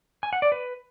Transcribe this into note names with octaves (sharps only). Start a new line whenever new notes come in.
G#5
F#5
D5
B4